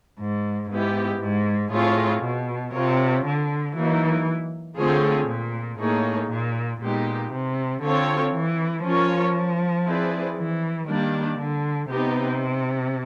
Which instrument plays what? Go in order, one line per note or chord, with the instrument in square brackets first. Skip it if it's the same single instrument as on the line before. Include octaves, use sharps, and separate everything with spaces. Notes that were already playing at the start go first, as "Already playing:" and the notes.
[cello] G#2
[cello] G#2 [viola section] G#3 B3 E4 G4
[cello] G#2
[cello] A2 [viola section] C4 F4 G#4 C#5
[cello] B2
[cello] C3 [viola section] C4 F4 A#4 C#5
[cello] D3
[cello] E3 [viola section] F#3 A#3 D#4
[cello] D3 [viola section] A3 C4 F4 G#4 C#5
[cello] A#2
[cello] A2 [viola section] A#3 D#4 G#4 C#5
[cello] A#2
[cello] A#2 [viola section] G#3 B3 D#4 G4
[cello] C3
[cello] D3 [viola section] C4 F4 A4 C#5
[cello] E3
[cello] F3 [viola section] C#4 F4 A#4 C#5
[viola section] C4 E4 G#4 B4 D5
[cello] E3
[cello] D#3 [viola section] G3 A#3 D4
[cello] D3
[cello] C3 [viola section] B3 D#4 G4